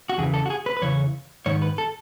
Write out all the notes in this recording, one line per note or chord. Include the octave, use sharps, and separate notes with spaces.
F#4
E2 C#3 E3 G#4
A4
F#4
G#4
B4
B4
E2 C#3 E3 C#5
G#2 D#3 C#5
B4
A4